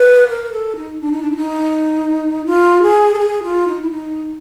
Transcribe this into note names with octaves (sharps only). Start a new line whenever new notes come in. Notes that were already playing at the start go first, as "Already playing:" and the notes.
Already playing: B4
A#4
A4
D#4
D4
D#4
D4
E4
D#4
F4
G#4
A4
G#4
F4
D#4
E4
D#4